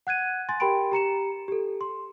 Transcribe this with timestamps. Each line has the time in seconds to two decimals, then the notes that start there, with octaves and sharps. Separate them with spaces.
0.07 F#5 F#6 G#6 D#7
0.49 G#5 C6 A6
0.60 G4 A#4 G5 B5 C6 D7
0.92 G4 A#5 C#7 E7
1.48 G4 A4
1.81 C6